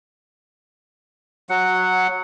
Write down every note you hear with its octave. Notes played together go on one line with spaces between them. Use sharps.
F#3 F#5